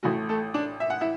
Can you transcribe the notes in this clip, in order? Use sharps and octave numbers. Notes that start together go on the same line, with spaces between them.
A1 A2 A3 F#4
A3 A4
D4 D5
E5
F#5
E4 E5